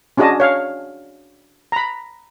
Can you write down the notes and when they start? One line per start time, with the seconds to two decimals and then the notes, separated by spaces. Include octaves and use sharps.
0.17 C#4 D4 F#4 G#4 D#5 A5
0.40 C#5 F5
1.72 A#5 B5